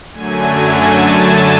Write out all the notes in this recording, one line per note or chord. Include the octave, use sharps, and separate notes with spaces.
F#2 D3 F#3 A3 G#5
A5